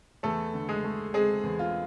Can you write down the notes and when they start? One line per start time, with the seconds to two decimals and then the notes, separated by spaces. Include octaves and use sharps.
0.23 E2 A3 A4
0.54 D3
0.69 G#3 G#4
0.84 A3
1.14 G#3 C4 G#4
1.43 E2
1.59 F4